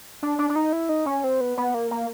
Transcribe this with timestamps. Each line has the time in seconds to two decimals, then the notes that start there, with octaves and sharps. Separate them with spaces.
0.23 D4
0.39 D4
0.50 D4
0.56 D#4
0.73 E4
0.89 D#4
1.06 C#4
1.24 C4
1.41 B3
1.57 B3
1.74 A#3
1.91 A#3